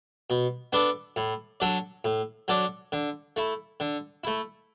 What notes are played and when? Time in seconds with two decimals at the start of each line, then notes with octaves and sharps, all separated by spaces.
0.30 B2
0.73 B3 D4 A4 D5
1.16 A2
1.60 F#3 D4 A4 D5
2.04 A2
2.48 F#3 D4 A4 D5
2.92 D3
3.36 A3 E4
3.80 D3
4.24 A3 E4